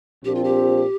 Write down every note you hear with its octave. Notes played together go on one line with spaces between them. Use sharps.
A#1 A#2 F3 C4 G4
F4
G4